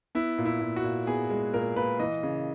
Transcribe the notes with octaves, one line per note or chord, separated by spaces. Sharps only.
B3 E4
A#2
E4
A#2
F#4
A#2
B3 G#4
G#3
A#2 A#4
A#2 B4
E3 D#5
C#3